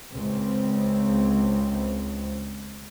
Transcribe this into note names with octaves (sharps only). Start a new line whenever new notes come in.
C#2 C4